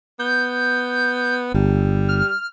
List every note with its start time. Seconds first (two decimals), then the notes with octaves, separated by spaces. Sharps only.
0.19 B3 G6
1.54 G1 G3
2.08 F6